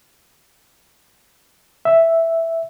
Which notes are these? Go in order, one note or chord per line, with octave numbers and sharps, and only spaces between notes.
E5